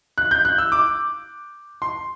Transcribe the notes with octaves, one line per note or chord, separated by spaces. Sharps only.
F#6
G6
F#6
E6
D6
C6